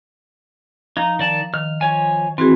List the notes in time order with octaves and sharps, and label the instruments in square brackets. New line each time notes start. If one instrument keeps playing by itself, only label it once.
[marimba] F3 A#5 [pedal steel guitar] D#4
[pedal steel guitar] D#3 D5 A5
[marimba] D#3 [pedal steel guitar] F6
[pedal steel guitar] F3 C#5 G#5
[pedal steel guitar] E3 [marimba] C4 F#4 G#4